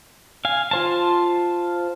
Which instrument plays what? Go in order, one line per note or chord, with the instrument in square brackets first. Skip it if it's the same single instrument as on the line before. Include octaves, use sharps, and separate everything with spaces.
[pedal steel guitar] F5 G#5
F4 C5 A5